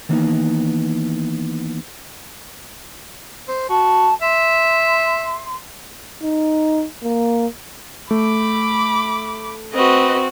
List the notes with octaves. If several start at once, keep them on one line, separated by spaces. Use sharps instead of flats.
D#3 E3 A#3 B3 D4 D#4
C5
F#4 A5
E5 C6
D#4
A#3
A3 B5 D6
C4 F#4 B4 D#5